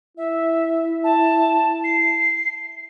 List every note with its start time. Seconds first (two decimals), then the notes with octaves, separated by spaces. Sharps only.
0.17 E4 E5
1.04 A5
1.84 C7